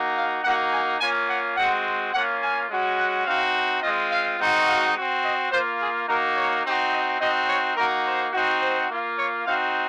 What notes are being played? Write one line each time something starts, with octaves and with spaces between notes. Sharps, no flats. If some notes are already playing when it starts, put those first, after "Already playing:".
Already playing: A#3 D#4 F#4
F5
A#3 D#4 F#4 F#5
G#5
A#3 C#4 F4 G#5
F#5
G#3 C4 F#4 F#5
A#3 C#4 F4 F#5
G#5
G#3 C#4 F#4
F#5
C4 D#4 F#4 F5
G#3 C4 F4 D#5
F5
G#3 C4 D#4 F#4
F5
C4 F#4
D#5
A#3 F4 C5
G#4
A#3 D#4 F#4 A#4
C#5
C4 D#4 F#4
D#5
C4 D#4 F#4 D#5
C#5
A#3 D#4 F#4 A#4
C5
C4 D#4 F#4
C5
A#3 F4
C#5
C4 D#4 F#4 F5